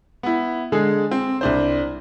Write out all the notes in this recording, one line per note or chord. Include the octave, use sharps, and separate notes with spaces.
B3 E4
D3 G#3 G#4 A4
C4
C2 D4 C5